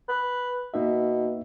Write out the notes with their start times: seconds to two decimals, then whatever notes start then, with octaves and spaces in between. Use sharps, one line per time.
0.09 B4
0.74 B2 A#3 D#4 E5